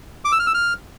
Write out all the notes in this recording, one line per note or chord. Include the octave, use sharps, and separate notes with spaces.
D6
E6
F6
E6
F6